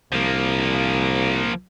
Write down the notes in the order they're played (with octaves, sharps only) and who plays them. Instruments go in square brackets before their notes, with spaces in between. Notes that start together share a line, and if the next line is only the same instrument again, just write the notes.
[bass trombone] C2 [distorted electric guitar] F3 A#3